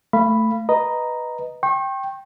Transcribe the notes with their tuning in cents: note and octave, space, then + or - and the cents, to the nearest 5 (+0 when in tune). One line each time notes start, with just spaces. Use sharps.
A3 +10 F5 -30 B5 +0
B4 +0 D#5 +0 A#5 +0
G5 +0 C#6 -40